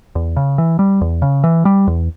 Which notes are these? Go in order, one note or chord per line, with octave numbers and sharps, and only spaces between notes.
E2
C#3
E3
G3
E2
C#3
E3
G3
E2